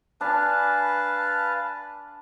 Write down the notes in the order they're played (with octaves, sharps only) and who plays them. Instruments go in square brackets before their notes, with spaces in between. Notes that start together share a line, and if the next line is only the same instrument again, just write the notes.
[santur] D4 G#5 [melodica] B4 F5 A5